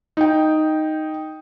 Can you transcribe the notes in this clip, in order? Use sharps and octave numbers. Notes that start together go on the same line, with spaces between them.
D#4 G5